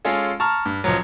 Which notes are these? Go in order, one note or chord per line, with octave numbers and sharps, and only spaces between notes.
G#3 C#4 F4 G#4 A4
A5 A#5 C#6 F6
G2
C#2 F3 F#3